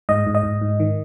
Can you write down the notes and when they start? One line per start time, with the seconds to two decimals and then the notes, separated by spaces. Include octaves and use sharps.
0.09 G#2 D#5
0.27 G#2
0.35 D#5
0.43 G#2
0.62 G#2
0.80 D#3